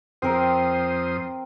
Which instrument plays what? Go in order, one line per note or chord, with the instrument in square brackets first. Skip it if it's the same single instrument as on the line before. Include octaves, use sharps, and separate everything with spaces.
[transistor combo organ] F2 C5 D#6 [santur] C4 A#4 G5